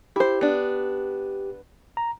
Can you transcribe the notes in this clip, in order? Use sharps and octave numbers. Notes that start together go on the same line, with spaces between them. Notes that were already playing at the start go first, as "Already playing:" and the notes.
E4 G4 C5
B3 D4
A#5